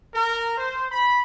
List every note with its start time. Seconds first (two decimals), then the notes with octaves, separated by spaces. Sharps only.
0.14 A#4
0.57 C5
0.90 B5